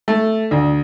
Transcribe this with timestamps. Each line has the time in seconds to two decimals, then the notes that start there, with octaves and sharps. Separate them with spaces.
0.08 A3
0.51 D2